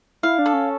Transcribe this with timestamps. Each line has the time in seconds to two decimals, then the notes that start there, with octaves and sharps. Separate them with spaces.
0.23 E4 F5
0.39 D4
0.46 A4
0.53 C#4